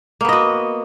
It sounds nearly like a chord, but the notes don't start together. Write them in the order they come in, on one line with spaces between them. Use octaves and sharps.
A#3 B3 D#5 F#4